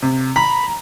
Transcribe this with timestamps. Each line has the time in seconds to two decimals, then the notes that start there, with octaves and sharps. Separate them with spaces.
0.02 C3
0.36 A#5 B5